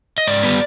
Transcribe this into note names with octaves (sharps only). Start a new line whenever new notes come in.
D#5
G#2 D5
G3 B3